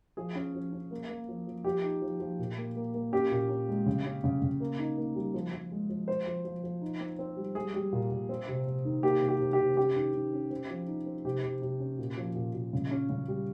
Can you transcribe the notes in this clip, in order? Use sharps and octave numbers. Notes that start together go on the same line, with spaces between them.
F3 G#4
C#4
F3
C#4
A#3
A#3
F3
F3
F3 G4
D#4
F3
F3
A#2
A#3
A#3
A#3
C#4 G4
A#2
C#4
G#3
C#3
C#4
C#3
C#3
A#3
D#4
A#3
G3
F3
F3
G#3
F3
C4 C5
F3
F3
F3
D#4
C4
C4
G3
G3 G#4
G3
A#2
A#2
C4
C3
C3
D#3
A#3 G4
C3
G4
C3
G4
C3
C#4 G4
D#3
D#3
C#4
C4
F3
D#4
C4
C3 G4
C3
C3
C#4
A#2
F3
A#2
A#2
C#3
C#4
C#3
G3